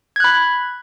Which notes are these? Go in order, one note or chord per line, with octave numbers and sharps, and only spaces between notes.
B5 F#6 G#6